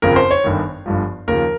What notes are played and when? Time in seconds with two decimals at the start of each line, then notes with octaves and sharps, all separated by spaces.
0.02 G1 F2 C#3 F3 A#4
0.16 C5
0.31 C#5
0.44 G1 G2 D#3
0.86 G1 G2 F3
1.28 D#2 C#3 F3 A#4